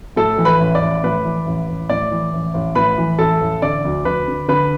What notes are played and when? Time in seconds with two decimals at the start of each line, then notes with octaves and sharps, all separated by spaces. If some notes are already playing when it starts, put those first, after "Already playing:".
0.16 A2 A4 A5
0.38 E3
0.45 B4 B5
0.60 A1
0.75 D5 D6
0.81 A1
1.04 A2 B4 B5
1.25 E3
1.46 A1
1.69 A1
1.89 A2 D5
2.11 E3
2.33 A1
2.54 A1
2.75 A2 B4 B5
2.98 E3
3.19 A1 A4 A5
3.41 A1
3.62 D3 D5 D6
3.85 D2
4.05 D2 B4 B5
4.28 D3
4.48 D3 B4 B5